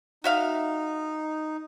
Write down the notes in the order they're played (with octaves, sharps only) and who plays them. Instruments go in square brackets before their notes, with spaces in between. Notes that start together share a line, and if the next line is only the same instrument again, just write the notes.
[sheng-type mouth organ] D#4 [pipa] F#4 E5 F5